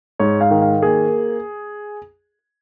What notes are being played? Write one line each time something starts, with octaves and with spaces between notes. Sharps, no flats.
G#2 C#5
F5
D#3
F5
A#3 G#4